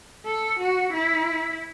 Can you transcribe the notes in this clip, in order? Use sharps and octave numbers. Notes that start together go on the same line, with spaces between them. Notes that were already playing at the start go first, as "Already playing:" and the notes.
A4
F#4
E4